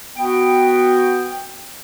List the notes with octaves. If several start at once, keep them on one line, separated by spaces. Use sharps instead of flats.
B3 F#4 G5